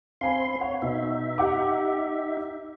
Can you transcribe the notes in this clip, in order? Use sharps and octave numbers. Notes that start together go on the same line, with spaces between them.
C4 F5 G#5 B5 C6
C#5 F#5
B2 D#4 E5
G4 F#5 D6